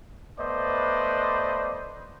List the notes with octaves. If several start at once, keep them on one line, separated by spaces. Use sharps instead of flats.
A3 B3 B4 C5 D5 D#5